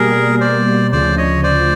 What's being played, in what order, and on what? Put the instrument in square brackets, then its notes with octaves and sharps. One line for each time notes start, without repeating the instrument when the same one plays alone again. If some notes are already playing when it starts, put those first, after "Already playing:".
Already playing: [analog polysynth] B2 G3 A#3 [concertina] G#4 A#4
[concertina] C5 D5
[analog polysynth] D2 C#3 F3 [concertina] C5 D5
[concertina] C#5 D#5
C5 D5